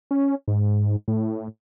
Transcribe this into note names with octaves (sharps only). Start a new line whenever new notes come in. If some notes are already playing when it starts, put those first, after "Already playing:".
C#4
G#2
A2